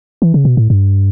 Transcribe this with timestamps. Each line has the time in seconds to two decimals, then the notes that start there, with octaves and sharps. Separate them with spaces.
0.22 E3
0.34 C#3
0.45 B2
0.57 A2
0.70 G2